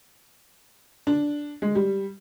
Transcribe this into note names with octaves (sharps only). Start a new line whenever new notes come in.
D4
G#3
G3